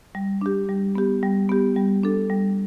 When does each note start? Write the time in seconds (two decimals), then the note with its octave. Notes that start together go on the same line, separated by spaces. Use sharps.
0.15 G3
0.41 D4 G4
0.69 G3
0.95 B3 G4
1.23 G3
1.49 B3 G4
1.76 G3
2.03 D4 A4
2.30 G3